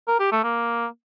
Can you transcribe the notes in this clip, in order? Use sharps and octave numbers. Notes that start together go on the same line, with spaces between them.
A#4
G4
A3
A#3